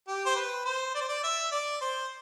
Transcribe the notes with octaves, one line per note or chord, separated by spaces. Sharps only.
G4
C5
B4
C5
D5
C5
D5
E5
D5
C5